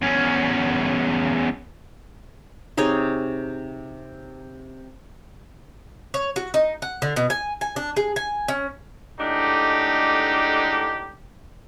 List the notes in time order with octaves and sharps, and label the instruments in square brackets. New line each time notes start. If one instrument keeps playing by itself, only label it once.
[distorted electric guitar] E2 C#4
[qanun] C3 D#4 G#4 C#5
[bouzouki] C#5
F#4
D#4
F#5
D3
B2
G#5
G#5
D4
G#4
G#5
C#4
[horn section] A2 D3 G#3 D4 D#4 G4